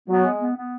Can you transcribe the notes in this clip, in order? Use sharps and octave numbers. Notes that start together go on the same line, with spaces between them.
F#3 B3
G#3
B3
B3